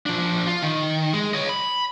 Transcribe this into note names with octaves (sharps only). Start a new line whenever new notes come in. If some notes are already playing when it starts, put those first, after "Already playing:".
F3 D4
F4
D#3
G#3
C#5 D#5
B5